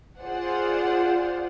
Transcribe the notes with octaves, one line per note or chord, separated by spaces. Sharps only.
F4 G#4 C5 D5 F#5